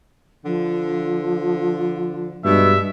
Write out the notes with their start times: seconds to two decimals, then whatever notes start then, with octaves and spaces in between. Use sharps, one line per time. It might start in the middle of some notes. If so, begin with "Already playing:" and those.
0.45 D3 F3
2.45 G2 B2 G#3 E5